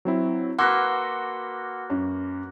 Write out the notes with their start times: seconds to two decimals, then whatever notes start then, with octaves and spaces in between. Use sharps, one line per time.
0.05 F#3 C4 E4
0.59 A#3 F#4 B4 F#5 C6 E6 F#6
1.90 F#2